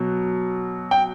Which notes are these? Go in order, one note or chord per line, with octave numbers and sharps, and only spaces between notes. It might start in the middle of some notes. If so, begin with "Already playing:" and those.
Already playing: B2 F#3
G5